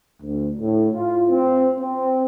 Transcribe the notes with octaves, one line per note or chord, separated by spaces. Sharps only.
D2
A2
F4
C4
C4